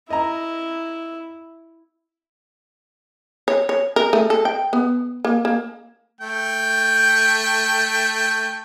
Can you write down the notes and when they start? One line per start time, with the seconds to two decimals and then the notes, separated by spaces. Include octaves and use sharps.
0.10 E4 D#5 A#5
3.48 C#5
3.69 C#5
3.96 A#4
4.13 A3
4.30 A4
4.45 G5
4.73 B3
5.25 A#3
5.45 A#3
6.21 A3 G5